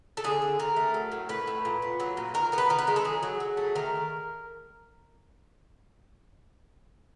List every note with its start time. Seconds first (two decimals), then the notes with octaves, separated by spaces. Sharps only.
0.17 A4
0.24 D3 G#4
0.42 D3
0.59 D3 A#4
0.76 A3
0.94 F#3
1.12 A2
1.29 A2 B4
1.47 A2
1.65 A#2
1.82 B3
2.00 F#3
2.17 A#2
2.34 D#3 A#4
2.52 B3 A#4
2.58 B4
2.69 D#3 A#4
2.79 B4
2.87 G#3 A#4
2.96 A4
3.04 F#3 G#4
3.23 F#3
3.40 F#3
3.57 A3
3.75 D#3 A#4